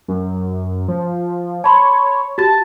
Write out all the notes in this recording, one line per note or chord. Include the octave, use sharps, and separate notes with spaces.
F#2
F3
C#5 A5 B5 C6
F#4 G4 A5 A6